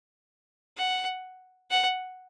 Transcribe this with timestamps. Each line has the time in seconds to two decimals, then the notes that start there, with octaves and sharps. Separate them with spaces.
0.77 F#5
1.71 F#5